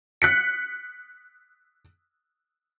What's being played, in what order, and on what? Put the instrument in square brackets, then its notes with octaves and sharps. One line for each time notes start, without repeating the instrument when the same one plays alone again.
[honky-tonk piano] F#6 B6 C#7